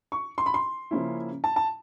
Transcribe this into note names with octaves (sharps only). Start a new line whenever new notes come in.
C#6
C6
B5
C6
C#3 F3 A#3 C#4 E4
A5
A5